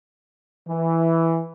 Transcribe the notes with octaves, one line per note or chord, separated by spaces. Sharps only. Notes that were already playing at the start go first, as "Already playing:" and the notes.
E3